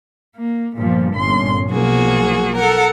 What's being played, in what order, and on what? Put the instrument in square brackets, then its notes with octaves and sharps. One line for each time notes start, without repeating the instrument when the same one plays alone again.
[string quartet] A#3
[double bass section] G1 F3 [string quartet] G2 A#2
[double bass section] G1 A#2 C#4 [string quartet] C6
[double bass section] B1 F3 [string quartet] A#3 F#4 G#4
[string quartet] A4 A#4 F#5